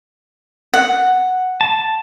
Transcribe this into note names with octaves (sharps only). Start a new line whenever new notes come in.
F#5
A5